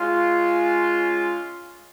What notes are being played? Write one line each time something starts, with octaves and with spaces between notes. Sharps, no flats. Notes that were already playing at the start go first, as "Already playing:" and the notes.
Already playing: G#3 C#4 F4